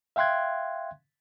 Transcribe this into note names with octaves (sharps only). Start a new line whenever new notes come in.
E5 F5 G5 C6 F#6 G#6